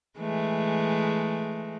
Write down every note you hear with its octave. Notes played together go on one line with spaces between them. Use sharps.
E3 G#3 A3